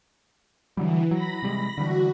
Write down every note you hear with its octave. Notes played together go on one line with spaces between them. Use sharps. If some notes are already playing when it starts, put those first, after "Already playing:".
D3 E3 F#3 G3
F#3 B5 A#6
C3 G3 G#3
D3 E3 G3 F#4